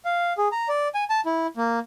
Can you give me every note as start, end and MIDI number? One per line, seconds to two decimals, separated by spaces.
0.05 0.33 77
0.38 0.48 68
0.52 0.68 82
0.69 0.88 74
0.94 1.04 80
1.10 1.21 81
1.26 1.47 64
1.57 1.79 58